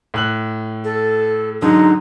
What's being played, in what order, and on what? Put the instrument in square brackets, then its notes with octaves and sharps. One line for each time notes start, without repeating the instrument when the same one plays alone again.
[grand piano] A2 F#6 F#7
[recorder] A4
[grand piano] G#2 D3 F#3 [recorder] D#4